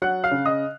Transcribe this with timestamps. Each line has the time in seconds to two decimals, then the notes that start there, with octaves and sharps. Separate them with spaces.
0.02 F#3 F#5 F#6
0.24 F5 F6
0.31 C#3
0.45 D#5 D#6